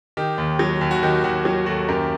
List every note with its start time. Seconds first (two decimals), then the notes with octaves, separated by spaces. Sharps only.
0.17 D#3 G4
0.38 D#2
0.59 F#3
0.81 D#2
0.91 F#4
1.03 D#3 G4
1.24 D#2 F#4
1.45 F#3 F#4
1.66 D#2 F#4 A4
1.89 F#2 G4 A#4